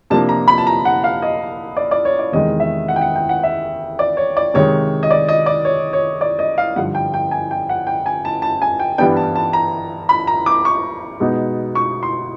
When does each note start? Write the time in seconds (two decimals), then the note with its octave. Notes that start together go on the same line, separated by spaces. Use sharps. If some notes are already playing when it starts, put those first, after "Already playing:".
0.10 C3 F3 A#3 D4 A5
0.29 A#5
0.48 B5
0.58 A5
0.67 A#5
0.85 F#5
1.04 F5
1.22 D#5
1.77 D5
1.91 D5
2.05 C#5
2.19 D5
2.32 E2 C3 D#3 G#3 D#5
2.60 E5
2.88 F#5
2.96 G5
3.01 F#5
3.16 G5
3.29 F#5
3.43 E5
3.99 D5
4.17 C#5
4.37 D5
4.54 C3 D#3 G#3 C#5
5.03 D#5
5.11 D5
5.29 D#5
5.46 D5
5.65 C#5
5.93 C#5
6.21 D5
6.39 D#5
6.58 F5
6.76 G2 D3 F3 F#5
6.95 G5
7.14 G5
7.31 G#5
7.51 G5
7.69 F#5
7.87 G5
8.06 G#5
8.25 A5
8.42 A5
8.62 G#5
8.79 G5
8.98 G2 E3 G3 B3 D4 G5
9.17 A5
9.35 A5
9.53 A#5
10.09 B5
10.27 A#5
10.46 D6
10.65 C#6
11.20 B2 G#3 B3 D#4
11.75 C#6
12.03 C6